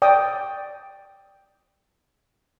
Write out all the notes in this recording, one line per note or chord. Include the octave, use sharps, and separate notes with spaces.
D5 G5 D#6